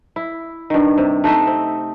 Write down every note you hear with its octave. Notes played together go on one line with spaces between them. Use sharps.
E4
G2 D#3
C3
A3 D#4 D#5 E5
C4